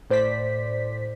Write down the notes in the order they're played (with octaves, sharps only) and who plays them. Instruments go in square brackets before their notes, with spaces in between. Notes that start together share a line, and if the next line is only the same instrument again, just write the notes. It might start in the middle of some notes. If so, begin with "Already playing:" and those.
[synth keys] A2 C5 D5 B6